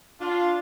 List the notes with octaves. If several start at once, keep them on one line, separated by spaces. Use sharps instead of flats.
D4 F4